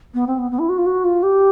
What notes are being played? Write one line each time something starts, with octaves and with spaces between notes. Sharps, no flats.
B3
C4
B3
B3
E4
F#4
F4
F#4
F4
G4